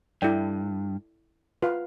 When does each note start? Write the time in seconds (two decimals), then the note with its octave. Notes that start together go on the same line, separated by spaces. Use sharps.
0.22 G2 E4 A4 D5 G5
1.62 F4 B4 F5